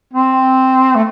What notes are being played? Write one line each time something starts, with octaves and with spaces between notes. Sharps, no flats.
C4
A3